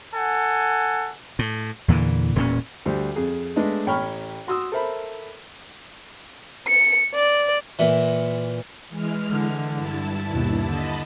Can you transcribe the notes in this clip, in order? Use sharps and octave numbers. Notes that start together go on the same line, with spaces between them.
A4 F#5 G#5
A2
E2 A#2 D3 E3
E1 A#2 A#3 C#4
D2 G3 C5
F2 G#4
G#3 A3 B3 D4 D#5
A1 C#5 G5 B5 C#6 F6
F#4 C6 D#6 E6
A4 A#4 C5 E5 B5
C#7
D5
A#2 E3
E3 G#3 F6
D3
G2 E4 A5
D#2 B2
D3 D#5 A5 B5